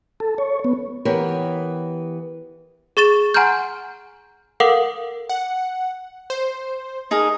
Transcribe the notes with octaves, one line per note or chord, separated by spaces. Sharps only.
A4
C#5
B3
E3 B3 G4 A#4 C#5
G#4 C#6 A6 E7
F#5 G#5 A#5 C6 F6 G6
A4 A#4 F5 F#5 D6 D#6
F#5
C5
D#4 G#4 A#4